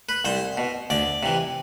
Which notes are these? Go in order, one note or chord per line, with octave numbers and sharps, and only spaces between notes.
B4
C2 C5
B2
D2 D5
C3 E3